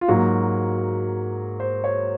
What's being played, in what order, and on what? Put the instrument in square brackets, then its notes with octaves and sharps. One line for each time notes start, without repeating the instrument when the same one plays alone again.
[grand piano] F4
G#2 F#3 A#3 F#4
C5
C#5